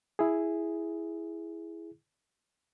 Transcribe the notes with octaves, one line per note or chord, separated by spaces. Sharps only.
E4 G#4